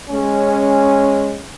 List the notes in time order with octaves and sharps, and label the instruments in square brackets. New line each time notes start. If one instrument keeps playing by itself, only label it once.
[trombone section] G#3 C#4